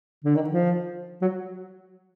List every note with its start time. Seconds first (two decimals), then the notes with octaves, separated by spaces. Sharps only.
0.24 D3
0.35 D#3
0.49 F3
1.22 F#3